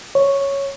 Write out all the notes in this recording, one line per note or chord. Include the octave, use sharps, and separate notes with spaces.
C#5